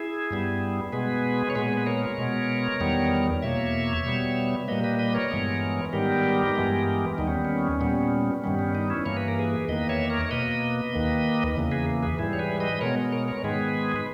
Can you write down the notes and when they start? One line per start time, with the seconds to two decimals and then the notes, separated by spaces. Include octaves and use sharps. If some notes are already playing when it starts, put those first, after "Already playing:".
Already playing: E4 G#4
0.31 G2 G3 B3
0.92 B2 G#3 B3 G#4 B4
1.50 C#5
1.55 A#2 G#3 B3 G#4 B4
1.77 B4
1.86 A#4 C#5
2.18 B2 G#3 B3
2.80 E2 D#3 G3 B3
3.42 E2 B2 A#3 C#5 E5
4.05 B2 G3 B3
4.68 A#2 G3 A#3 B4 D#5
4.84 B4 D#5
4.99 B4 D#5
5.14 A#4 C#5
5.31 G2 E3 G#3 B3
5.93 G#2 D#3 G3 B3 G4 A#4
6.56 G2 E3 G#3 B3
7.18 D#2 D#3 G3 B3 D#4
7.27 C#4
7.45 C#4
7.81 A#2 G3 B3
8.44 G2 D#3 G3 B3 C#4
8.59 C#4
8.75 D#4
8.90 C#4 E4
9.06 G2 E3 A#3 C#5
9.17 B4
9.28 A#4
9.39 G#4 B4
9.68 E2 D#3 A#3 B4 D#5
9.89 C#5 E5
10.10 A#4 C#5
10.25 C#5
10.31 B2 A#3 B4 D#5
10.93 D#2 D#3 A#3
11.56 E2 C#3 E3 A#3
11.71 G#4 B4
12.02 G#4 B4
12.18 G#2 E3 G3 E4 G#4
12.33 C#5
12.39 G#4 B4
12.60 B4 D#5
12.81 B2 G#3 B3 A#4 C#5
13.12 A#4 C#5
13.28 A#4 C#5
13.43 G#2 D#3 G#3 B3 G#4 B4
13.96 B4